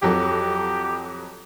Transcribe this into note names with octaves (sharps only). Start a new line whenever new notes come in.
F2 F#3 G4 A4